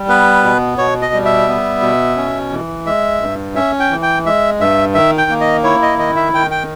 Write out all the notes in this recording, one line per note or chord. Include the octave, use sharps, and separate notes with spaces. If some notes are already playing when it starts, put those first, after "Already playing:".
Already playing: G3
B3 B4
B2
B2 C#5
D#5
G3
E5
B3
B2
C#4
E3
G#3 E5
G2
C#4 E5
G5
E3
G5
G#3 E5
G2 E5
D#3 E5
G5
A#3
D#5
E4 C#5
D#5
D#3 D#5
E5
D#3 G5
G5